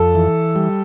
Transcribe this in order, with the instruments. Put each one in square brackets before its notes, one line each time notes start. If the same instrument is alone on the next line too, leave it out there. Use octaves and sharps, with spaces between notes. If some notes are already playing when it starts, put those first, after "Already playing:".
Already playing: [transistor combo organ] F2 [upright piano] A4
[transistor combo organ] E3
G3